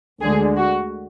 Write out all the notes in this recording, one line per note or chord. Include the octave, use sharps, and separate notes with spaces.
D2 D3 G#3 G#4
F#4